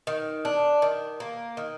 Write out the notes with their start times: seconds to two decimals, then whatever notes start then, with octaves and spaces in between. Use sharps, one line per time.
0.07 D#3
0.45 D4
0.82 D#3
1.20 A#3
1.57 D#3